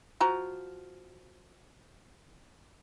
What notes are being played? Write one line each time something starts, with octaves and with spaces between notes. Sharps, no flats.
F3 F#4 A#5